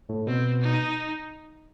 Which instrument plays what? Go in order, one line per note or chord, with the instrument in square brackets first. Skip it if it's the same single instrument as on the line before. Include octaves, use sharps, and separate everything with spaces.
[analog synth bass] A2
[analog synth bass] B2 [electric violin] C4
[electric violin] D#4